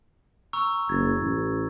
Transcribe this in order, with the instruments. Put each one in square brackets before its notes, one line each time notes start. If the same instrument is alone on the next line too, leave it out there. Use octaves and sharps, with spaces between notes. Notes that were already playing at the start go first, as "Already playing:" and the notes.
[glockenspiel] A#5 C#6 E6
[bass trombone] F#1 [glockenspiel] G#6 A6
[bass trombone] A1